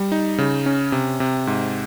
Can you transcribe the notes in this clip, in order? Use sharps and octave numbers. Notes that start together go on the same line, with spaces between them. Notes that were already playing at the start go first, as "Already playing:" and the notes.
Already playing: G3
D#4
C#3
C#4
C3
C3
G#2